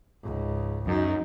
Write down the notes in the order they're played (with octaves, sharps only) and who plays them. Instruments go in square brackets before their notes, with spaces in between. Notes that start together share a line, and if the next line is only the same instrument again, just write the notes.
[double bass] C#2 G#2
[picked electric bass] F#2 [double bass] D#4